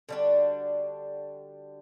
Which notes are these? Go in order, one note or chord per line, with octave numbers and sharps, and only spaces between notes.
D3 G3 D4 F#4